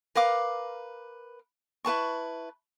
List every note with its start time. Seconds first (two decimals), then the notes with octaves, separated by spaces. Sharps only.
0.15 A#4 B4 F5 D6
1.85 E4 B4 A5 C#6